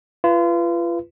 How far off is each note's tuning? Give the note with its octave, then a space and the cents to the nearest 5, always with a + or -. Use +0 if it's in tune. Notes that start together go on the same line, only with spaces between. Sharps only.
F4 -35 B4 +0